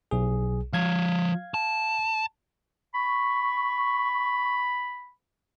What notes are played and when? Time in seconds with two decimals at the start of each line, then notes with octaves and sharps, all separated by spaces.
0.11 B1 G#4
0.73 F3 C#5 F5 G#6
1.54 A5
2.94 B5 C#6